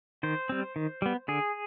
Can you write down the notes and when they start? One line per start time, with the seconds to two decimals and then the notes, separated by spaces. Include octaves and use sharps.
0.23 D#3 C5
0.49 G3 C4
0.76 D#3
1.02 G3 B3
1.28 D3 G#4